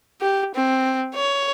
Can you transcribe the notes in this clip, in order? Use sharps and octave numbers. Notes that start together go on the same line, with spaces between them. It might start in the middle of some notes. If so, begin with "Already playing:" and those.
G4
C4
C#5